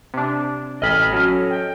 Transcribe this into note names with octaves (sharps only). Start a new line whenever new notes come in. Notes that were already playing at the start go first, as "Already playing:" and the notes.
C3 D4
A1 A4 D#5 B5 F6
F#3 C#4
G5